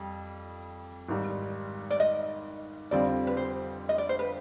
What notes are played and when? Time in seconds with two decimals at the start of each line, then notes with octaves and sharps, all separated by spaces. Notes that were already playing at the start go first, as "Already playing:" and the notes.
Already playing: F2 G3
1.08 G#1 G#2 G3
1.91 D5
2.00 D#5
2.91 F2 D3 G3 C4 F4 D5
3.27 B4
3.37 C5
3.89 D#5
3.98 D5
4.09 C5
4.19 B4